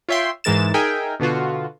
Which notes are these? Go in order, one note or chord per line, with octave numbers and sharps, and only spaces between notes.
F4 C#5 E5 G5 C6
G#2 E3 G#3 A#4 A6 E7
D#4 G#4 A#4 E5 G5 G#5
B2 D3 B3 F4 F#4